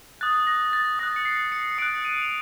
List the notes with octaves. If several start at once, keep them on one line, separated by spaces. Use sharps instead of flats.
D#6 F#6 A6
A#6
A6
D#6 F#6 A#6
C#7
C7
C#7
D#6 F#6 D7
D#7
F7